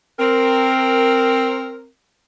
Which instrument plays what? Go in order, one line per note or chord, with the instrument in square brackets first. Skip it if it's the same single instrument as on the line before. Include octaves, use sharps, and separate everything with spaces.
[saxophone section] C4 A#4